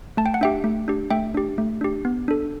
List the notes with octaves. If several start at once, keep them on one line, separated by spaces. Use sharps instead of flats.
A3 A5
G5
F#5
D4 G4 E5 G5
A3
D4 G4
A3 E5 G5
D4 G4
A3
D4 G4
B3
D4 A4